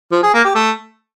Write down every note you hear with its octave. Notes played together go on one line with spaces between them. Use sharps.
F3
G#4
A#3
G4
A3